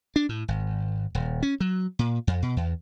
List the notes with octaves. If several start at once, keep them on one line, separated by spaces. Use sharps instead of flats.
D4
A2
G#1
D#1
C#4
F#3
A#2
F2
B2
E2